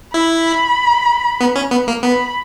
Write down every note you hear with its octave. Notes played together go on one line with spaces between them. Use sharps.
E4 B5
B3
C#4
B3
A#3
B3 B5